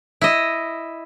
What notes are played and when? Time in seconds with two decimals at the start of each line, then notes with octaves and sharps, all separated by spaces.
0.21 E4 D#5